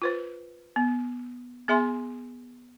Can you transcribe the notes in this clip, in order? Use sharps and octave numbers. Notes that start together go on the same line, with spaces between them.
F4 B4 C5
B3
B3 G#4 E5 G#5 C6